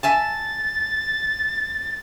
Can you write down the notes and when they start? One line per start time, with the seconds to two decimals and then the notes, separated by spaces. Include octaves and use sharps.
0.03 E5 G#5 A5 A6